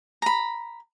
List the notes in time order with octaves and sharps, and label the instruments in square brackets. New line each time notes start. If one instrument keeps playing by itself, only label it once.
[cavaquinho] A#5 B5